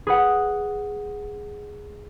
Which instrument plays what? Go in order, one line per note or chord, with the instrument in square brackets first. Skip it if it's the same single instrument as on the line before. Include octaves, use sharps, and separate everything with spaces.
[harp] G#4 B4 F#5